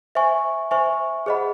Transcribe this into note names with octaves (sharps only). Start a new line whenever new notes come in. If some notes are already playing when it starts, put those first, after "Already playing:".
C5 E5 G#5 C#6
C5 E5 G#5 C#6
G#4 C5 D#5 F#5 B5